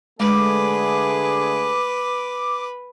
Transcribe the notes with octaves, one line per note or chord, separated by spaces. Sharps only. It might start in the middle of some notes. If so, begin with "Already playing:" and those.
D3 G#3 A3 G#4 B4 D6